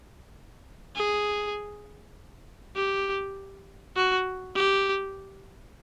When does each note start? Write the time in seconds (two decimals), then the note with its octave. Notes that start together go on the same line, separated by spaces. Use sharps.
0.96 G#4
2.76 G4
3.96 F#4
4.56 G4